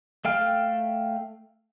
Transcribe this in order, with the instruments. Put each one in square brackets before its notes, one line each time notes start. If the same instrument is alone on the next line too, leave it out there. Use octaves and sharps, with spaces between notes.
[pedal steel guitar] A3 F5 G5 F6